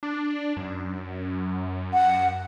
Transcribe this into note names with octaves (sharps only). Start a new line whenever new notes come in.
D4
F#2
F#5